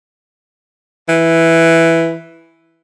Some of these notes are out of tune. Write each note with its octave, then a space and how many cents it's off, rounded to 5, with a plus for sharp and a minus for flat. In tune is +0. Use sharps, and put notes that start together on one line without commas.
E3 +0